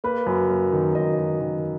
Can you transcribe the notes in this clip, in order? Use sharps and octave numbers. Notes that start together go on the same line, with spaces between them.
A#3 B4
F#2
A#3
D#3
F#2 D#5
F#2
D#3